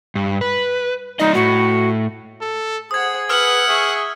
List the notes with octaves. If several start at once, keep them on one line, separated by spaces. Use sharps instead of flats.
G2
B4
G3 D#4 D5 D#5
A2 F#4
A4
G#4 C5 F#5 D#6 G#6
B4 F#5 E6 F6 G#6
G#4 E5 C#6